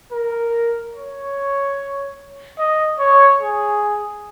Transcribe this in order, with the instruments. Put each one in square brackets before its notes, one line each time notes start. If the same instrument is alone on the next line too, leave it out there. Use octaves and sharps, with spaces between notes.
[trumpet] A#4
C#5
D#5
C#5
G#4